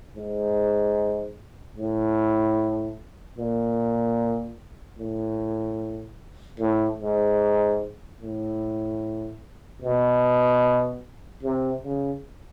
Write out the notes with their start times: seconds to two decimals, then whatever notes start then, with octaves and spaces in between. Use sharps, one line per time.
0.16 G#2
1.77 A2
3.38 A#2
4.99 A2
6.60 A2
7.00 G#2
8.21 A2
9.82 B2
11.43 C3
11.83 C#3